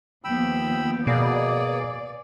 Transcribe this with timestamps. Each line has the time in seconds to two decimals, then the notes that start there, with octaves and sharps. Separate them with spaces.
0.24 D#2 F3 B3 G5 B5 E6
1.07 B2 A#3 G#4 D5